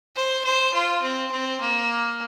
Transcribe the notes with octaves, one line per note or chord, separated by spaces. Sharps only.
C5
C5
F4
C4
C4
A#3